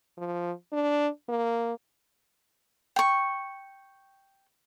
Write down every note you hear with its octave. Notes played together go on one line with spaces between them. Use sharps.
F3
D4
A#3
G5 C#6